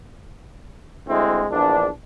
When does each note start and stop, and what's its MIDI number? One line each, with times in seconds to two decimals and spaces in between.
1.08 1.46 38
1.08 1.46 56
1.08 1.46 60
1.08 1.46 64
1.51 1.88 34
1.51 1.88 40
1.51 1.88 62